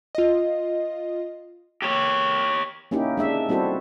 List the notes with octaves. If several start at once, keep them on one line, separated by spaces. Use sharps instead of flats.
F4 D#5
G4 C#5
A#3 C#4 D#4 E4 G4
G#3 D4 E5
G3 C4 E4 F#4 A4 C5